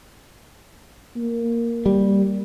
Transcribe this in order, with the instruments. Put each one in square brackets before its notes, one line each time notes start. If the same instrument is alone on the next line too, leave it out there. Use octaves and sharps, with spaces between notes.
[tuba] A#3
[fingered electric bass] G3